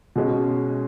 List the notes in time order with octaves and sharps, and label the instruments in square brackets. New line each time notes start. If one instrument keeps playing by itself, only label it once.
[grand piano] B2 G#3 C#4